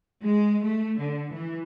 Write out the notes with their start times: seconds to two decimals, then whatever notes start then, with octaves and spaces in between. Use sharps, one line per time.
0.23 G#3
0.64 A3
0.97 D3
1.34 E3